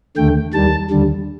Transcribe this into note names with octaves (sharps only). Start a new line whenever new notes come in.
D#2 D3 A3 G5
D#2 D#3 G3 A5
D#2 D3 G3